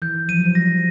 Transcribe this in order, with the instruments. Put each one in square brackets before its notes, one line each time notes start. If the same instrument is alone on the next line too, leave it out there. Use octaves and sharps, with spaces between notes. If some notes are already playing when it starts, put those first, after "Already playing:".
[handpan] E3 [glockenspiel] G6
[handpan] F3 [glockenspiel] D#7
[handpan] F#3
F3
[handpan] G3 [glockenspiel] A#6